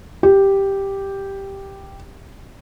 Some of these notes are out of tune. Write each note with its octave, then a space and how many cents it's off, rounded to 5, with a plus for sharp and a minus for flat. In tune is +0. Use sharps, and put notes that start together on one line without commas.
G4 +0